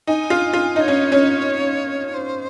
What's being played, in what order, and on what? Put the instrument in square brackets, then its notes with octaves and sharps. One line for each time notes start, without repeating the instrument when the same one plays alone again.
[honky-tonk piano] D#4 [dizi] G#5
[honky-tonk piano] F4
F4
[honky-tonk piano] D#4 [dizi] D#5
[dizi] C#5
[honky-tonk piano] C#4
C#4
[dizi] C5